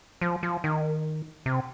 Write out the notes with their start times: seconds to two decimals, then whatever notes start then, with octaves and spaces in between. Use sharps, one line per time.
0.21 F3
0.43 F3
0.64 D#3
1.46 C3